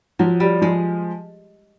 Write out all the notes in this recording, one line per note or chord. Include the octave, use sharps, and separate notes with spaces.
F3 F#3
G3
F3 G#3